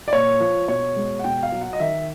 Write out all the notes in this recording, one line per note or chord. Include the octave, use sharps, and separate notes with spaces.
D5
A#2 C#5
F3
B2 C#5
G#3
F#5
B2 G5
F5
F#3
F#5
D#5
D#3 E5